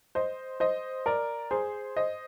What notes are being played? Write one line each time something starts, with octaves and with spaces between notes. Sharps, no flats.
C5 D#5
C5 D#5
A#4 D5
G#4 C5
C5 D#5